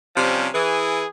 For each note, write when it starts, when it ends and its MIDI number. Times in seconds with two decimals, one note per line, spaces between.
0.16 0.49 48
0.16 0.49 53
0.16 0.49 55
0.16 0.49 61
0.53 1.04 52
0.53 1.04 68